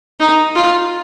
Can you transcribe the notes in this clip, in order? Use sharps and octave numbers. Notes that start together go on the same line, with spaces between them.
D#4
F4